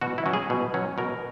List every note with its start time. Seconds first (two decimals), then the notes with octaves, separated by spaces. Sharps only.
0.01 B2 F#4
0.18 E4
0.26 F#3 C#4
0.33 G#4
0.50 B2
0.74 F#3 C#4
0.98 B2 A#4